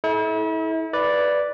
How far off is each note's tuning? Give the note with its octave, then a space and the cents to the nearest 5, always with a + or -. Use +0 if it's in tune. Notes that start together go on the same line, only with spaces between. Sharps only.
E4 -40 A4 -35
B4 +0 D5 +0